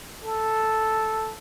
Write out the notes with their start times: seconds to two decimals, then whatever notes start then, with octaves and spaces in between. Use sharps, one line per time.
0.24 A4